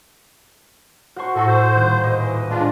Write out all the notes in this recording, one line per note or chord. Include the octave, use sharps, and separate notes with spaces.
F#4 C5 F#5 C#6
A2 F#4 A4
C5
D#1 F#6
E3 D#5
G#3 D4 F4